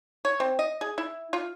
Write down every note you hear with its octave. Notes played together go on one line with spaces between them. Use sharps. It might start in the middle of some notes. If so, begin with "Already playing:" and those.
C#5
C4
D#5
G#4
E4
F4